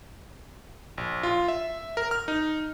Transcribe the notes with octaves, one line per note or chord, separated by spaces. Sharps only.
A#1
F4
E5
A#4
F6
D#4